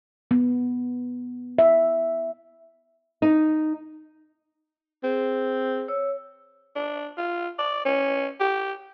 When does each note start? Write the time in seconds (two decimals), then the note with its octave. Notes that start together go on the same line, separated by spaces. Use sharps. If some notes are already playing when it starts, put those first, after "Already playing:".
0.31 B3
1.59 E5
3.22 D#4
5.03 C4 G#4
5.88 C#5 E6
6.76 D4
7.18 F4
7.59 D5
7.85 C#4
8.40 G4